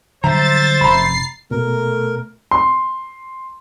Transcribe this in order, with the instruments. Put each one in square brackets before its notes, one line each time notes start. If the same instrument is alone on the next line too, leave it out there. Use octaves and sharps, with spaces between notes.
[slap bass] D3 F#3 G3 [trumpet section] C5 E5 [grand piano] A#5 [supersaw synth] A6
[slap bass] F1 F#2 [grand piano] A#5 B5 [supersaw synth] C7
[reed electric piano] B2 [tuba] A3 [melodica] A#4
[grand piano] C6